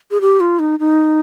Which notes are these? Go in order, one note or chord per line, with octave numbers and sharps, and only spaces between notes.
G#4
G4
F4
D#4
D#4